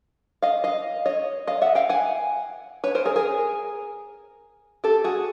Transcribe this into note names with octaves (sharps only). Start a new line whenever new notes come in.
D#5 F5
D#5 F5
C#5 D#5
D#5 F5
E5 F#5
F5 G5
F#5 G#5
B4 C#5
A#4 C5
G#4 A#4
G#4 A#4
G4 A4
F#4 G#4